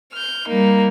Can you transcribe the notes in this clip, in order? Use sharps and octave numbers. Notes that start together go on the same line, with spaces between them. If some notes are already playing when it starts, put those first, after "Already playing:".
F6 G6
G3 A#3 D#4